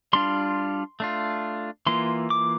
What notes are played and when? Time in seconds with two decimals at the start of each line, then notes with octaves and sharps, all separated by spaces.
0.13 G3 D4 F4 C6
1.00 A3 D4 F4
1.87 E3 A#3 F4 C6
2.30 D6